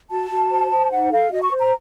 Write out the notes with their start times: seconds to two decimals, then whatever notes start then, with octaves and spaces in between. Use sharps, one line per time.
0.10 F#4 A5
0.31 F#4
0.50 C5
0.71 C5
0.90 D#4 F#5
1.11 A4 F5
1.31 F#4 D#5
1.41 C#6
1.51 C5
1.61 A#5